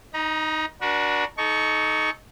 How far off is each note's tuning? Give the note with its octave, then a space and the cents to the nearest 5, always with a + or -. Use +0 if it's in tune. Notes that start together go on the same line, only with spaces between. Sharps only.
D#4 +0 A#5 +35
D4 +0 F#4 +0 A#4 +45
D#4 +0 A4 -30 C#6 +10